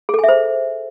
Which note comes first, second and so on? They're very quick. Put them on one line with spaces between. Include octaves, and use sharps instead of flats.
G#4 A4 G#5 E5 C5